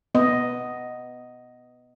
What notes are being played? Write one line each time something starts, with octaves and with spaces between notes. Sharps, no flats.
B3 D#5